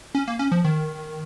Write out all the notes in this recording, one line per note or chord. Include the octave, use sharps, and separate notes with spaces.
C#4
A#3
C#4
F3
D#3